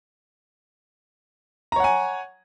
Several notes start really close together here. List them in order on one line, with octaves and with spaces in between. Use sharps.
A#5 C#5 F#5 G#5